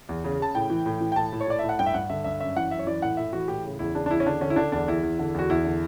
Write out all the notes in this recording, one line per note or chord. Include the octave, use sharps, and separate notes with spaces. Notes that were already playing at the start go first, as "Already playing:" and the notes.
E2
C#3
C#3 A5
A2 G5
E3
A2
E3
G5
A2 A5
A2
C#5
A2 D5
A2 E5
F#5
G2 G5
E5
G2 F#5
D3 E5
G2 E5
F#2 E5
E3 F#5
F#2 E5
C#5
E3 D5
A2 F#5
A2 E5
E3 F#4
A2 G4
C#3
E2 E4
C#3 D4
D4
E2 E4
C#4
D3 D4
D3 C#4
E4
D3 D4
E2 D4
E2 E4
E2
D3
E2 F#4
E2 E4
D3